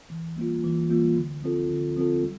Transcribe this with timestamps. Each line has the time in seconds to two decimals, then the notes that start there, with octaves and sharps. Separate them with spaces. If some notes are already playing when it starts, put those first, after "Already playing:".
0.10 E3
0.36 G3 A#3 F4
0.64 E3
0.90 G3 A#3 F4
1.16 D3
1.43 F3 C4 F4 A4
1.70 D3
1.96 F3 C4 F4 A4
2.23 G3